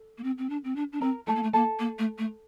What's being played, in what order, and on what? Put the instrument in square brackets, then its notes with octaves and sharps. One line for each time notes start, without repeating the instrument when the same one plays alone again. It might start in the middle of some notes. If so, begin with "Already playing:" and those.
Already playing: [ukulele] A4
[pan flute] A#3
C4
C4
D4
C4
D4
D4
[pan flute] C4 [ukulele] A#4 A#5
[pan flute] A3 [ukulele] A4 A5
[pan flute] A#3
A3
[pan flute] A#3 [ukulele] A4 A5
[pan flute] A#3
A3
A3